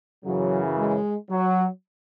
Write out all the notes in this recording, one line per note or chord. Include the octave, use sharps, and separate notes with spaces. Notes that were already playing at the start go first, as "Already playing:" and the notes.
F#2 C#3 E3 F#3
G#3
F#3